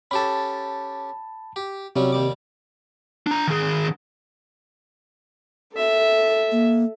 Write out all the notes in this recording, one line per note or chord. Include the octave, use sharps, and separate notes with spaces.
C#4 G4 A4 A5 B5
G4
C3 F#3 G3 C#4
D#2 G3 D6
D4 A#5
D#3 G#4
A4 E5
A#3